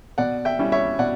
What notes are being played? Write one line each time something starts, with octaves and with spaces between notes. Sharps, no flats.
B2 D5 F#5
E5 G5
G3 C#4 E4
C#5 E5
B2 D5 F#5